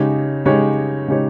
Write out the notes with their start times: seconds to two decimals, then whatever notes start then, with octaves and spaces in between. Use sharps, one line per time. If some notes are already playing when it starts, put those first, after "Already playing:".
Already playing: C#3 G#3 D#4 G4 C#5
0.46 C#3 G#3 D#4 G4 C#5
1.08 C#3 G#3 D#4 G4 C#5